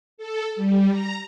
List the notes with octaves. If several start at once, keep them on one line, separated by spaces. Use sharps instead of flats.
A4
G3
A#5